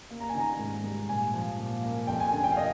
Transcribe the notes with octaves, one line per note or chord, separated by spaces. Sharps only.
A#3
A#5
G#5
D#3
A#5
G#2
G3
A#2 G#5
F3
A#2
A#3
F2 G5
G#5
D3 G#5
G5
F5
D#5